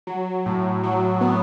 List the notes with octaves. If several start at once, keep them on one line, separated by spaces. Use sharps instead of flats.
F#3
A2
F#3
B3